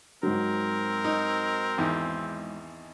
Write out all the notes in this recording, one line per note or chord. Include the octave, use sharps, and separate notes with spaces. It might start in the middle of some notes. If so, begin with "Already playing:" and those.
G#2 F#3 C4 A#4
D#4
G#1 E2 D#4